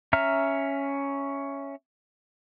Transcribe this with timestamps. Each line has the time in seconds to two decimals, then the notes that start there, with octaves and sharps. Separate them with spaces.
0.13 C#4 E5 A#5 F6